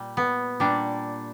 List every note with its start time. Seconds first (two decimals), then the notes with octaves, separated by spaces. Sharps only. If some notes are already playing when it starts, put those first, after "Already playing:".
Already playing: A#2 G3
0.17 B3
0.60 A#2 G3 D4